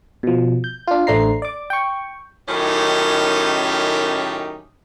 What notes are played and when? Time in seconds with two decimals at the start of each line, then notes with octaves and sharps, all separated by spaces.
0.23 B2 F3
0.64 G6
0.87 D4 F4
1.07 A1 A3 D4 C5 A#5 C7
1.42 D5 D6
1.70 G5 C#6
2.48 F#2 A2 D#3 C#4 D#4 G4